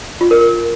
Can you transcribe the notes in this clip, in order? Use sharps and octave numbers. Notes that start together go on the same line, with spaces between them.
F4
A#4
A#4